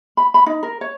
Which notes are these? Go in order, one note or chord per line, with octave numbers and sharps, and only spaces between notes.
B5
B5
D#4
A#4
C#5